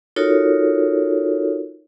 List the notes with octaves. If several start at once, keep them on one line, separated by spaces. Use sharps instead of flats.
D#4 F4 F#4 A4 A#4 C#5